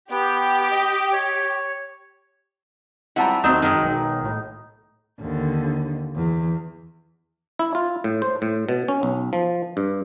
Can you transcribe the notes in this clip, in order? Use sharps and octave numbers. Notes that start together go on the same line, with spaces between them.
B3 G4
D#5
C#5
G3 C4 E4 F#5 A5 A#5
D#2 F#3 A3 C4 D#4
F#2 D#3 F#3 G#3
B1
A2
D#2 D3
E2
E4
F4
A2
C5
A2
B2
C#4
B1
F3
G2